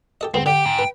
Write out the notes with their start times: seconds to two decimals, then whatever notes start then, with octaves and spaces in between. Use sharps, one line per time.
0.21 G4 A4 D#5
0.34 D2 G#2 B3 C4
0.46 D3 G4 G5
0.66 G#2
0.79 B4